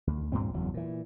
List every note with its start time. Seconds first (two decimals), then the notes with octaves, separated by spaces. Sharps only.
0.07 D2
0.32 G2 A#2 C4
0.53 F#1 E2 F#3
0.74 A#2 E3